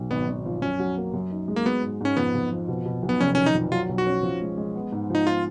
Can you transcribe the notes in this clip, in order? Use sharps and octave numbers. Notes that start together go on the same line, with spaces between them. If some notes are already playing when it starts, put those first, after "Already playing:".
Already playing: B1
G#1 B3
G#1
F3
F#2 C#4
F#3
A#3
F#2
D#4
G#3
A#3
F#3 B3
G#2
G#2 C#4
F2 B3
F2
F3
B2
B2
B1
B3
F1 C#4
D#3 C#4
D#4
F2
F#3 F4
B1
F#4
C#4
F3
G#3
G#3
B3
G#2
F3 D#4
F4